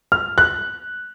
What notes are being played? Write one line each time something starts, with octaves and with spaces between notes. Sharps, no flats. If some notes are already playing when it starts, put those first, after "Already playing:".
F6
F#6